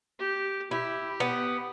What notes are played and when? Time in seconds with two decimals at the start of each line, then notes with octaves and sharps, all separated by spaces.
0.19 G4
0.71 E4 G4
1.20 B3